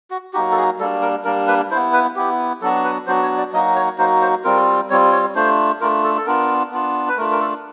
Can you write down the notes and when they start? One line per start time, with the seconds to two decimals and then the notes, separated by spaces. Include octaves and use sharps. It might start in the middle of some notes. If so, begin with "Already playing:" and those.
0.11 F#4
0.33 F#3 A#3 D#4 F#4 G4
0.51 A4
0.57 G#4
0.79 G3 A#3 D4 A4
1.02 A#4
1.25 G3 A#3 D4 A#4
1.48 B4
1.70 E4 C5
1.75 B3
1.93 B4
2.16 B3 E4 G4
2.62 F#3 B3 D4 F#4 A4
2.84 B4
3.07 F#3 B3 D4 F#4 C5
3.23 C#5
3.38 D5
3.53 F#3 A#3 D#4 F#4 D#5
3.75 C#5
3.98 F#3 A#3 D#4 F#4 C5
4.21 C5
4.44 G3 C4 F4 A#4
4.90 G3 C4 F4 C#5
5.12 C#5
5.35 A3 D4 F4 C5
5.81 A3 D4 F4 A#4
6.04 A4
6.17 A4
6.26 B3 D4 F4 A#4
6.72 B3 D4 F4
7.09 B4
7.17 A3 D4 F4 A#4
7.31 A#4
7.40 A4